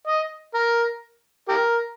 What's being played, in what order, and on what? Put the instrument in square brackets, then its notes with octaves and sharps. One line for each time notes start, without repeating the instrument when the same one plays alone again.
[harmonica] D#5
A#4
G4 A#4